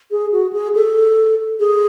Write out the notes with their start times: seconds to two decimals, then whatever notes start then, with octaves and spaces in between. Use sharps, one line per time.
0.11 G#4
0.32 F#4
0.53 G#4
0.75 A4
1.59 G#4